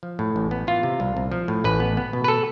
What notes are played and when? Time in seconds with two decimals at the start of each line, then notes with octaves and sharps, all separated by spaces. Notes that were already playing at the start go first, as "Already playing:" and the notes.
0.03 F3
0.19 A2
0.36 A1
0.51 B3
0.67 E3 F4
0.83 C3
1.00 C2
1.17 C2
1.31 F3
1.48 A2
1.64 A1 B4
1.80 B3
1.97 B3
2.13 B2
2.24 B4
2.28 A4